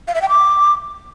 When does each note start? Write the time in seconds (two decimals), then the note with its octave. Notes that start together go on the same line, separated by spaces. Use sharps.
0.08 F5
0.15 E5
0.22 G5
0.29 D6